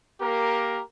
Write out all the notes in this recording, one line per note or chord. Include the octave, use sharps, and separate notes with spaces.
A#3 G4 A#4